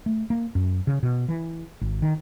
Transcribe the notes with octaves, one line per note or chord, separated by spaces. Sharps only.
A3
A#3
F#2
C#3
B2
E3
G#1
D#3